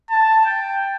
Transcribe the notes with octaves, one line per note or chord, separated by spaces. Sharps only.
A5
G5